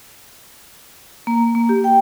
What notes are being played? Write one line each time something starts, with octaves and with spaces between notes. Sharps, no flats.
A#3
A#3
G4
G5